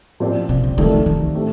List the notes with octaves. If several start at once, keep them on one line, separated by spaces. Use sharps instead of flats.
A#2 F3 C4 G4 D5
C3
D3
C3 D#3 F3 A3 D4 A4
D#3
A2 A3 C4 G4